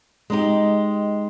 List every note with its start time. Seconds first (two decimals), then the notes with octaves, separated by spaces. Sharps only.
0.30 G#3 D#4 G4